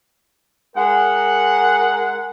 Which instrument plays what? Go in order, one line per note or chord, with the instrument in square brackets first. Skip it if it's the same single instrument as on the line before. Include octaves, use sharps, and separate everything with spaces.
[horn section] G#3 A#4 F#5